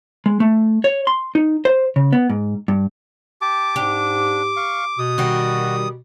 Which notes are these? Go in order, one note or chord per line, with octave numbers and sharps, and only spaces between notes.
G#3
A3
C#5
C6
D#4
C5
C#3
B3
G#2
G2
G4 A5 D6
G#2 D4 G4
F5 C#6
B2 D#6
D#3 G3 F#4